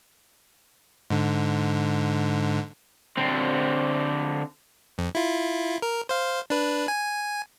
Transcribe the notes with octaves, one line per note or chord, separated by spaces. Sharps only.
G#2 D3
D3 C4
F2
E4 F4
A#4
C5 F5
D4 B4
G#5